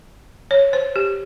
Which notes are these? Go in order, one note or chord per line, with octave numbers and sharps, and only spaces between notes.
C#5
C5
G4